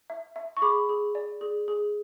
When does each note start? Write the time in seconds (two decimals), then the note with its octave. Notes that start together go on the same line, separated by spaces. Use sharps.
0.10 E5
0.36 E5
0.57 C#6
0.62 G#4 B5 D6
0.89 G#4
1.15 D5
1.41 G#4
1.68 G#4